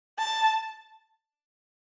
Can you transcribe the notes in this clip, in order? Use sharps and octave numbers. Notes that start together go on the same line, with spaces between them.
A5